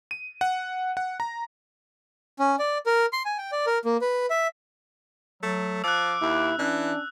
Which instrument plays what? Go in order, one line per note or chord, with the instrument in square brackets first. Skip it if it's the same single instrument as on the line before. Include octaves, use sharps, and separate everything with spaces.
[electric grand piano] D#7
F#5
F#5
A#5
[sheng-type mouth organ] C#4
D5
A#4
C6
G#5
G5
D5
A#4
A#3
B4
E5
[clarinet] F#3 [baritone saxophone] A3
[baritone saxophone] F3 [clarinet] D6 [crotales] E6 F#6
[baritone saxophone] D#2 [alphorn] E4
[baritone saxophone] E3 [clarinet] C#4 [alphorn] D4